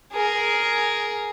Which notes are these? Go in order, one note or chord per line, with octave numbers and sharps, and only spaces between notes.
G#4 A#4